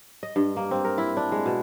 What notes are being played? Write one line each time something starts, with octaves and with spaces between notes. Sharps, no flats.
D#5
G2
A#3
C4
A#4
E4
D4
G#3
B2